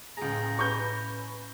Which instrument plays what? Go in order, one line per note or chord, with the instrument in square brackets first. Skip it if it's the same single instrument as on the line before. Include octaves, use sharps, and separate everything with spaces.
[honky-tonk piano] C#2 G#4 [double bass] A2 [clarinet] A#5
[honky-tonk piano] C#4 B4 [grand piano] C#6 G6